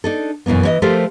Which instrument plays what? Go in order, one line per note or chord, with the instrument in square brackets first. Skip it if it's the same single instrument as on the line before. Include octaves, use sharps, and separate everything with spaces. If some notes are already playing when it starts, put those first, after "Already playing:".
[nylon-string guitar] D4 D#4 A4
F#2 B2 E3 A#3 B3
E3 C#5 D#5
F3 A3 G4 A4 A#4 C5